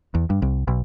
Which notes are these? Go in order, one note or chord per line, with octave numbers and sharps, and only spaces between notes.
E2
G2
C2
B1